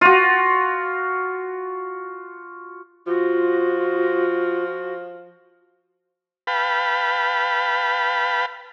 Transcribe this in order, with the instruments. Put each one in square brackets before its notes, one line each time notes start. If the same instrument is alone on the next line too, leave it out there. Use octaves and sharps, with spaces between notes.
[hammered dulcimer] F4 F#4
[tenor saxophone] F3 [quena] F4 [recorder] F#4
[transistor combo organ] B4 F5 G5 A5 B5